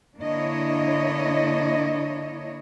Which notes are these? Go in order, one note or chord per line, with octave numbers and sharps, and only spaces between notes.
D3 A#3 D4 E4 C#5 D#5